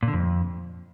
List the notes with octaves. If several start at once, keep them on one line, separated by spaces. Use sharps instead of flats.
A#2
D3
F2